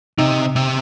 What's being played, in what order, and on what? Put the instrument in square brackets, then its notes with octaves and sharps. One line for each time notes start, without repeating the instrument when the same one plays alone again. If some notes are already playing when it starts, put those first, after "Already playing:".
[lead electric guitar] C3 [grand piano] D#4
[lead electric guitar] C3